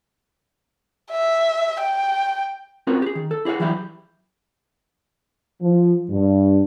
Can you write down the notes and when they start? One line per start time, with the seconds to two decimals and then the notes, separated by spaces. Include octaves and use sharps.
1.11 E5
1.79 G5
2.87 C4 C#4 F4 F#4 A#4 B4
3.02 G4 G#4
3.15 D#3
3.31 A4
3.45 E4 G#4 C#5 F5 F#5
3.60 E3 F#3 G3 E4 G4
5.61 F3
6.09 G2